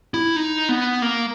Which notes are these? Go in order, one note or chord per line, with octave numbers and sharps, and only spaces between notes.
E4
D#4
B3
A#3